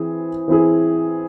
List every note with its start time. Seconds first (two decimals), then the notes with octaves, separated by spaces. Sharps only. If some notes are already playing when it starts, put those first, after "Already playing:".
Already playing: E3 C4 E4 G#4
0.48 E3 C4 E4 G#4